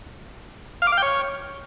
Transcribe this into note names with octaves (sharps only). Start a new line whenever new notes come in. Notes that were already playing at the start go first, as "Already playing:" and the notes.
F5
D6
F5
G5
C#5